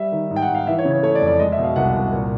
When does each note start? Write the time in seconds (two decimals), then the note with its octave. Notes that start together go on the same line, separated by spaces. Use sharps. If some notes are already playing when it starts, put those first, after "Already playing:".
Already playing: G3 E5
0.12 D#3
0.31 G#2
0.36 G5
0.42 F#5
0.49 G#2
0.55 F5
0.67 E3 E5
0.79 C#5
0.85 C#3
0.91 C#5
1.03 A3 C#5
1.15 D5
1.21 F2
1.27 D5
1.39 G#3 D#5
1.52 E5
1.58 B2
1.64 F5
1.76 C2 F#5
1.94 C2
2.13 A#2